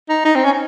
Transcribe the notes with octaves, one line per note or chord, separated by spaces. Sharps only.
D#4
D#4
C4
C#4